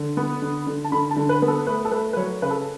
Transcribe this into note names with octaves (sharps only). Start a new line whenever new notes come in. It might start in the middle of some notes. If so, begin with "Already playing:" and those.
Already playing: D3
B3
D3
D3
A5
D3 B5
A5
D3
B4
B3 B4
A4
A3 B4
A4
A3 B4
B4
F#3 C#5
C#3 B4
A4